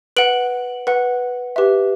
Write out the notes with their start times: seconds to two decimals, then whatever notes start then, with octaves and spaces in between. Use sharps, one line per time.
0.17 B4 F#5 D7 F#7
0.87 B4 F#5
1.56 G4 B4 E5